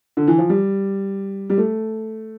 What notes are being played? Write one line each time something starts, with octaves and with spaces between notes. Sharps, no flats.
D3
E3
F3
G3
G3
A3